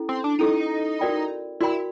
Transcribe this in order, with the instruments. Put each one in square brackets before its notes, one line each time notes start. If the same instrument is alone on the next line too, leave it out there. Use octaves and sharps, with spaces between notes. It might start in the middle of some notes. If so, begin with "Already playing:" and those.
Already playing: [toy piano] C#4 E4 A4
[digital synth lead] C4
D4
[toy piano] C#4 E4 A4 [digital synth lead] D#4
[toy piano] F#4 A#4 D5 G5 B5
[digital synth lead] E4 [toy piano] F#4 A#4 D5 G5 B5